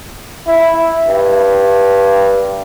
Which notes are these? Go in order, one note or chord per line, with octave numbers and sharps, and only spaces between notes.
E4
G2